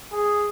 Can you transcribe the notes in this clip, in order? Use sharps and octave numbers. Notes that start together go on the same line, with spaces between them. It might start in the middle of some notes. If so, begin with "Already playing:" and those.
G#4